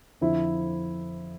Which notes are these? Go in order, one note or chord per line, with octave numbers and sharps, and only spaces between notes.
F2 D3 F3 E4